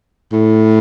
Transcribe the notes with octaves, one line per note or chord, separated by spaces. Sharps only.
A2